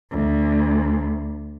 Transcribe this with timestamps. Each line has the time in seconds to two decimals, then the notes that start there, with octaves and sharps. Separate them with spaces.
0.12 D2